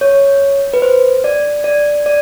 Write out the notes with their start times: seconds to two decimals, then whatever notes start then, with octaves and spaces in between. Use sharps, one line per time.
0.01 C#5
0.74 B4
0.82 C5
1.24 D5
1.64 D5
2.06 D5